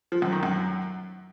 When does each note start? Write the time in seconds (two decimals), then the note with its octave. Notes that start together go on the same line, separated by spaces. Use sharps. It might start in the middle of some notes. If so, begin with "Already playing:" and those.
0.12 F3
0.22 F#2
0.32 D#3
0.43 F#2